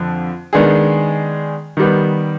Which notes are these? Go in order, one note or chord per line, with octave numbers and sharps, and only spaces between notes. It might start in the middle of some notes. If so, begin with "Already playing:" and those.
Already playing: F2 D3 F3
D#3 G#3 B3 D4 G#4
D#3 G3 B3